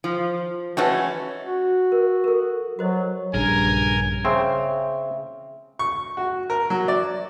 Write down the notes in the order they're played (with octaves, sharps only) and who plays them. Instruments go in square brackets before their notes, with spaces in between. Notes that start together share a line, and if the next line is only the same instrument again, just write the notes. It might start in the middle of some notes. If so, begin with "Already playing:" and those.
[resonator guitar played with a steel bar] F3
[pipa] E3 G#3 A3 [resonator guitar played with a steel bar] C#4 F#4
[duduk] F#4
[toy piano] A#4
A4 A#4
[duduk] F#3 [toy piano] F#4 C5 D#5
[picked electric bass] A#1 C#3 [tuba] G2 [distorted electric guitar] A#4 [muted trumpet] G#5
[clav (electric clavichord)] C#3 C4 [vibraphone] E5
[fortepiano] C#6
F#4
A#4
F#3
D5